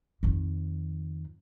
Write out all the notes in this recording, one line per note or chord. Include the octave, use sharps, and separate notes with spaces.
F2 D#3